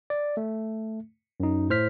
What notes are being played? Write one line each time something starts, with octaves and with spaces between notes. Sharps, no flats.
D5
A3
F#2 D#4
A2 C5 F6 B6